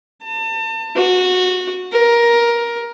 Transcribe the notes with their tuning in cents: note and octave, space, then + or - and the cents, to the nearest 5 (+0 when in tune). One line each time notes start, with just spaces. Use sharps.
A5 +35
F#4 -15
A#4 +15